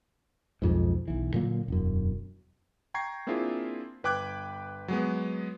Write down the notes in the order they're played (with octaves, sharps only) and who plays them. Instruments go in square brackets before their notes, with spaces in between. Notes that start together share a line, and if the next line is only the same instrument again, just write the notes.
[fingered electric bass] B1 F2 G#2
B1 E3
A#2 D3 F#3 A#3
E1 F#2
[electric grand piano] G5 A#5 C#6 G#6 C7
A#3 C4 D4 E4 F4 G#4
G1 B4 G5 D6 F#6 G#6
F#3 G#3 B3